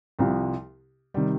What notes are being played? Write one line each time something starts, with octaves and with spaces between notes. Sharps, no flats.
C2 C3 F3
C3 D#3 G3